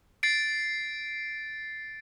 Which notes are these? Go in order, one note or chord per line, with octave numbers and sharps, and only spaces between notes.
A6 C7 D7